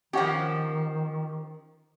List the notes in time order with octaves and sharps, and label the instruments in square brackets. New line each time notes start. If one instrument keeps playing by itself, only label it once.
[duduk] D#3 [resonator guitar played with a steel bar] F3 G4 [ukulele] C#4 D#5 F#5